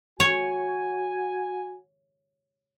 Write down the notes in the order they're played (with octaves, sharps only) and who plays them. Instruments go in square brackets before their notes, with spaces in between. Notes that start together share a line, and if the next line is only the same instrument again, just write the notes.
[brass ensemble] F#4 G#5 [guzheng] C#5